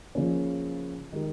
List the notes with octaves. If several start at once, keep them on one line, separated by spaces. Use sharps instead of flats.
C#3 F3 A#3 C#4
D#3 G#3 D#4 G4 A#4